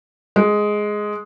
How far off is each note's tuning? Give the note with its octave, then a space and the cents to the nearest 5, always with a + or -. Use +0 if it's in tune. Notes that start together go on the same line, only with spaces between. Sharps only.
G#3 +5